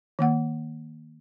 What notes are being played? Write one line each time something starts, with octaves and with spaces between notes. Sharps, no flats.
D#3 A#3 F#5